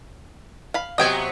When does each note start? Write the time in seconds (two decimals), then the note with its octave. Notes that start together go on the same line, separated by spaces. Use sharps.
0.74 F5 B5
0.98 C3 F#3 B3 D#5 G5 G#5